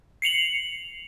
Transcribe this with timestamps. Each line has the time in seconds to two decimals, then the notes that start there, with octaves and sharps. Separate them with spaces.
0.22 C7 C#7 F7 F#7